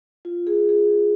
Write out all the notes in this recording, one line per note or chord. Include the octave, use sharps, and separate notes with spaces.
F4
G#4
G#4